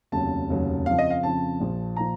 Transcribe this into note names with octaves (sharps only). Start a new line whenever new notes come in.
F1 D#2 C#3 F#3 A5
F1 D#2 C#3 F#3
F2 C#3 F3 F5
D#5
F5
F2 C#3 F3 A5
A#1 A#2 F3
A#2 F3 A#5